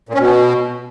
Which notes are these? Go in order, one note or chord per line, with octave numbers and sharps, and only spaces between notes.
A#2
C#4
B2